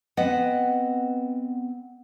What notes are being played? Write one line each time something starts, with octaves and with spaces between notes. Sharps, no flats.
B3 C4 B4 D#5 F#5